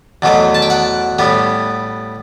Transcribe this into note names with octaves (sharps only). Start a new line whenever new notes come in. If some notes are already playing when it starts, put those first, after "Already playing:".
E2 B2 F#3 A3
A5
G5
F#5
A2 G3 B3